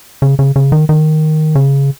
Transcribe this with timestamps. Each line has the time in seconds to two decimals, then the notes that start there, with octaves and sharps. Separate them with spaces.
0.22 C#3
0.39 C#3
0.56 C#3
0.72 D#3
0.89 D#3
1.55 C#3